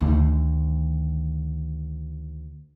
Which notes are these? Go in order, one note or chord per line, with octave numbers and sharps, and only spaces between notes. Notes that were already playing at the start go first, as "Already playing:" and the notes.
D2 D#3